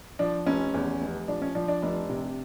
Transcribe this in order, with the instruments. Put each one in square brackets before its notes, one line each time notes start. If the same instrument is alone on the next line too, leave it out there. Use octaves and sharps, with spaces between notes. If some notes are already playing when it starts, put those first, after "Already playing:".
[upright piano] F3 D4
F1 C#4
E2
F1
F3 D4
C#4
F3 D4
D4
F1 D4
C3